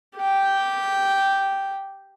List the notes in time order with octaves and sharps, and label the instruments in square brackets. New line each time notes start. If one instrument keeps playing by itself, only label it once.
[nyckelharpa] G4 G5